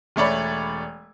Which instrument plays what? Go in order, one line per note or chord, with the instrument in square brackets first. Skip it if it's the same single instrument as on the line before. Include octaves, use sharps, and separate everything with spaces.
[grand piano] E1 A3 C#5 D5 B5